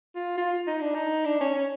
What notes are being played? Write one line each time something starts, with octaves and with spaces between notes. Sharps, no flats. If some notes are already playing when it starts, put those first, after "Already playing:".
F4
F4
D#4
D4
D#4
D4
C#4
C#4